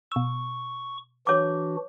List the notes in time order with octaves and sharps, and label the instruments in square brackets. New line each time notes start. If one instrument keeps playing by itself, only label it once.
[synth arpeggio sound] B2 E6 [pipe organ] C#6
[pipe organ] E3 D4 F#4 [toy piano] C#5 D6